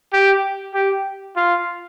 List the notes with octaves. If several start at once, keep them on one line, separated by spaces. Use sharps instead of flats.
G4
G4
F4